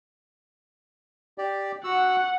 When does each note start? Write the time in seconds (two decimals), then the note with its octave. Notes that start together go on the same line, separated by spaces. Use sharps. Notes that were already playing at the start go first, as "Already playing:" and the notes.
1.38 G4 D5
1.84 F#4 F#5 E6